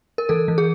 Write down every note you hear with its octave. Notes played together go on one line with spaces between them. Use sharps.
A#4
E3 A4
E3
G#4